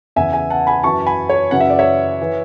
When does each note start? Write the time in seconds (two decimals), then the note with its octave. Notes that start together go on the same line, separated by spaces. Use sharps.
0.16 E2 C#3 E3 E5 G#5
0.33 E5 G#5
0.50 F#5 A5
0.67 G#5 B5
0.83 F#2 E3 A5 C#6
1.06 G#5 B5
1.29 C#5
1.51 F#2 C#3 E3 F#5
1.60 E5
1.70 D5
1.79 C#5 E5
2.21 E3